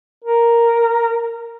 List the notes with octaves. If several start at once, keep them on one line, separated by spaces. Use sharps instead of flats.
A#4